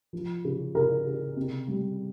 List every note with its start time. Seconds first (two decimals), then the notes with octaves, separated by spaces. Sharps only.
0.13 F3
0.45 C#3
0.75 C#3 A#4
1.07 C#3
1.37 C3
1.68 G3